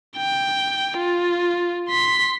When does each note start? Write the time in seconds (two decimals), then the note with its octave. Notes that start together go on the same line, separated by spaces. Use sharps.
0.17 G5
0.98 F4
1.89 C6 B6